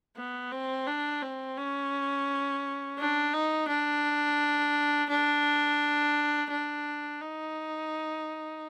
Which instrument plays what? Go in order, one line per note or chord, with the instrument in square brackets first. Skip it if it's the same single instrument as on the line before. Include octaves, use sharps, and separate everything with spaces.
[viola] B3
C4
D4
C4
C#4
D4
D#4
D4
D4
D4
D#4